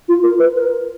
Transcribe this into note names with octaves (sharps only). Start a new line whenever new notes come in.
F4
A#4
B4
A#4